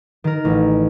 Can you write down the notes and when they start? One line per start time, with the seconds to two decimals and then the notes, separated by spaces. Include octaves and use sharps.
0.24 D#3 A#4
0.45 A1